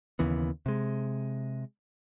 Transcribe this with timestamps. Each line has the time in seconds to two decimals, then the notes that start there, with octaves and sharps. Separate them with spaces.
0.19 D#2 C#3 E3 B3
0.66 C3 G#3